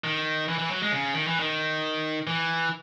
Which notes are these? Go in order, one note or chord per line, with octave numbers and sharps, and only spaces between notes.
D#3
E3
E3
F#3
G#3
C#3
D#3
E3
D#3
E3